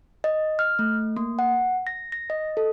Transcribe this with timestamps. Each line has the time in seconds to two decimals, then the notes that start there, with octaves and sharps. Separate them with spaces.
0.24 D#5
0.59 F6
0.79 A3
1.17 A#3
1.39 F#5
1.87 A#6
2.12 A#6
2.30 D#5
2.57 A4